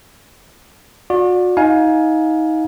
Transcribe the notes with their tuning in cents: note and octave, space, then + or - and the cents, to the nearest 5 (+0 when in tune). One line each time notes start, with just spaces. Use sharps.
F#4 -40 D5 +0
D#4 +30 F5 +20 G#5 +20